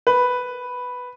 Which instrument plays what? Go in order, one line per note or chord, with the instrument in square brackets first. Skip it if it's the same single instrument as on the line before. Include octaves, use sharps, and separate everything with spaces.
[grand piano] B4